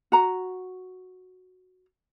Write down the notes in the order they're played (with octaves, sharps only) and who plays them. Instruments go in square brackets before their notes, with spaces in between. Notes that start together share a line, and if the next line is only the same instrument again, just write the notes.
[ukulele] F#4 A#5